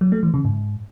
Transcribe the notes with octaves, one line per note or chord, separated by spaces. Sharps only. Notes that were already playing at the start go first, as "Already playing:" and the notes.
F#3
A3
E3
C#3
G#2